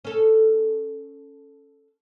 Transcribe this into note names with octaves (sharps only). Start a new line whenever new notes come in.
C#4 A4